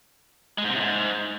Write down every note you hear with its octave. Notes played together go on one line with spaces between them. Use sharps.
G#3
G#2
C3
A2
G#2